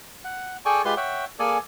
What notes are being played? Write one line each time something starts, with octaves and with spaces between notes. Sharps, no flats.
F#5
G#4 A4 D5 G5 G#5 C#6
G#3 F4 G4 B4 C6
C#5 E5 F#5 G5
A#3 G#4 A4 D5 G#5